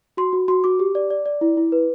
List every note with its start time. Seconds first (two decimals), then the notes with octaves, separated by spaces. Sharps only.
0.17 F#4 C6
0.33 F#4
0.48 F#4 C6
0.64 F#4 D6
0.80 G4
0.95 D5
1.10 D5
1.26 D5
1.41 E4
1.57 E4
1.72 B4